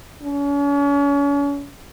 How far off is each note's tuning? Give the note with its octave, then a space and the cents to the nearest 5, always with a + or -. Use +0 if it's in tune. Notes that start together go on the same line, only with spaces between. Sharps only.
C#4 +40